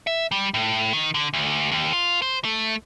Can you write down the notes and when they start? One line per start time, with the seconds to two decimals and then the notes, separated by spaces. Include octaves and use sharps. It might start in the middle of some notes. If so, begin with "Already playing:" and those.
0.07 E5
0.31 G3
0.54 A2
0.93 D#3
1.14 D3
1.33 D2
1.71 D#2
1.93 F4
2.22 C5
2.45 A3